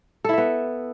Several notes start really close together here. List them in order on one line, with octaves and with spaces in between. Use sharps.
A4 E4 E5 B3